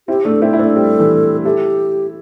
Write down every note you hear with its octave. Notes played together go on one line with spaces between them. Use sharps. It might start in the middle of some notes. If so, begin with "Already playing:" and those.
C4 E4 G4
A3 D4 A4
C4 E4 C5
E4
A3 D4 A4
G3 C4
E3 A3
E4 G4 A4